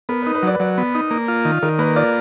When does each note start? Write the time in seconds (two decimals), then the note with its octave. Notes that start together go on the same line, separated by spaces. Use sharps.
0.09 B3 A#4
0.22 B4
0.27 D#4
0.35 B4
0.43 F#3 D5
0.55 B4
0.60 F#3 D5
0.78 B3
0.95 D#4
1.11 A#3
1.28 F4
1.45 D#3
1.63 D#3 A#4
1.79 A#3 B4
1.96 F4 D5